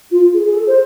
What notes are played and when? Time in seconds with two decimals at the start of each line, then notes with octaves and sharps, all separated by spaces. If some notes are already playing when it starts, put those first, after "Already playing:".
0.10 F4
0.33 G#4
0.45 G#4
0.55 A4
0.67 C5